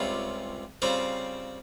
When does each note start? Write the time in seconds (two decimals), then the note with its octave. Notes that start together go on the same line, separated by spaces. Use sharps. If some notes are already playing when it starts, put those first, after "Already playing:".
Already playing: C#2 C3 G3 C#4 F4
0.82 C#3 G3 C4 F4 C5